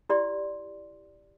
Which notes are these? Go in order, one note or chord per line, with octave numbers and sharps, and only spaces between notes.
E4 G4 D5 C6